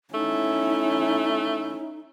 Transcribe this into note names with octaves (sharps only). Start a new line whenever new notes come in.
A3 C#4 D#4 E4